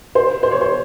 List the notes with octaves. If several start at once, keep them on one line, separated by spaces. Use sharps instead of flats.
C5
C5
C#5
C5